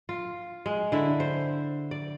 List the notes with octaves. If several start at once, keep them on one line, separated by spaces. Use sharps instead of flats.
F4
G#3
D3 E4
C5
D5